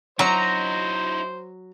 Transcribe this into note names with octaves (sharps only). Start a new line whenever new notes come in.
F#3 D#4 E4 C5 A#5